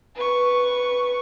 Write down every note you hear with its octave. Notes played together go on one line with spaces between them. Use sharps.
B4 C#6